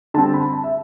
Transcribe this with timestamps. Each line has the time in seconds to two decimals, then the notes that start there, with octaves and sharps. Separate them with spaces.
0.14 D3 G3 C4 A5
0.34 B5
0.53 A5
0.64 E5